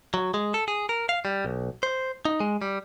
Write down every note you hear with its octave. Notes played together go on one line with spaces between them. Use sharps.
F#3
G#3
A4
G#4
A#4
F5
G3
B1
C5
D#4
G#3
G3